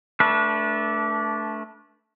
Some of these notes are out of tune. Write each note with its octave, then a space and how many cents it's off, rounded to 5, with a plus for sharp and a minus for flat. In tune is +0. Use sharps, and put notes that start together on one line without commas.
A3 +0 D4 -15 B4 -35